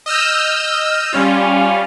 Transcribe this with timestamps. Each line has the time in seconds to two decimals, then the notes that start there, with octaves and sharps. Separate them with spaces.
0.06 D#5 E6 F6 G6
1.13 G3 C#4 F4